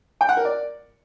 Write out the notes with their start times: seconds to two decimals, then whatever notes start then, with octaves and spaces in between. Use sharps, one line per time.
0.21 G5
0.29 F#5
0.37 A#4
0.45 D5